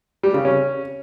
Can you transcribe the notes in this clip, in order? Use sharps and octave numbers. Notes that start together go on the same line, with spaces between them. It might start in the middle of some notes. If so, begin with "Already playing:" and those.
G3
C#3
C#4